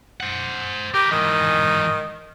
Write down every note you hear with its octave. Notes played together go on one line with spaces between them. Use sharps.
C5 F#5
G4 A#4 B4
G#2 D#3 E3